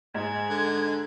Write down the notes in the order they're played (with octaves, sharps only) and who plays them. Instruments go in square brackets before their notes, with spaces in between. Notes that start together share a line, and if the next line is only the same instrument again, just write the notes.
[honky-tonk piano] G#2 [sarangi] G#3 [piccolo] G#6
[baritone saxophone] D3